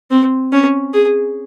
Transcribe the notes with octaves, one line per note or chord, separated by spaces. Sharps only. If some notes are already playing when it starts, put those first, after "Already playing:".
C4
C#4
G#4